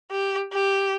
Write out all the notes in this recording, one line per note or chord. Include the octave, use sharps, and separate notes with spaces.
G4
G4